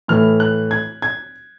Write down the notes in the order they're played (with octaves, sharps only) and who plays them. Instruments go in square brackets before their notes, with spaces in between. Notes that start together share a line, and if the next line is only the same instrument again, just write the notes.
[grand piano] A2 E3 A3 F6
F#6
G#6
G#6